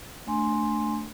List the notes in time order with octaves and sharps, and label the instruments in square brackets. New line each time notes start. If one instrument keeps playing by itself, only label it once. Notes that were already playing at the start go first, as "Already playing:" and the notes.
[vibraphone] A3 D4 G#5 C6